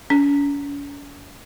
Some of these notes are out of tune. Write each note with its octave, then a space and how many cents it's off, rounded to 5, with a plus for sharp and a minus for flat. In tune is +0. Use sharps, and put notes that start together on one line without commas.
C#4 +40